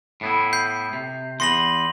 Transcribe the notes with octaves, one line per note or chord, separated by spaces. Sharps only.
A2 B3 E4
G6 C7
C3
E2 B3 C6 A#6 F#7